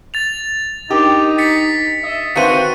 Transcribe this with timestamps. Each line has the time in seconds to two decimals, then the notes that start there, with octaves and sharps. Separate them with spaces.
0.14 A6 F7
0.90 D4 D#4 G4 A#4 G5
1.38 A6 B6 C#7
2.04 D#5 E5
2.36 D#3 C4 F#4 B4 E5 F5 C#7 D#7